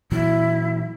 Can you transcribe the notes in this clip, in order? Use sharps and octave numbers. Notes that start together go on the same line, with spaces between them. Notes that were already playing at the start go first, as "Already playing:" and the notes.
A#2 E3 F#3 E4